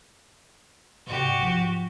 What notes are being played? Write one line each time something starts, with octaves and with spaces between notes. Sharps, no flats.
G#2 C3 F#4 G4
G#2 F3